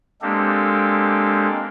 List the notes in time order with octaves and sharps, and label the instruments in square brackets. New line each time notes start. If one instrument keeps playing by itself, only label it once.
[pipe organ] G#3 A#3 C4 D4 G4 A4